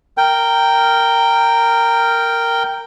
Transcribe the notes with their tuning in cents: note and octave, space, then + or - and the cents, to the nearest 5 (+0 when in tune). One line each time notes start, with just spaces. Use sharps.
A#4 -10 G5 +0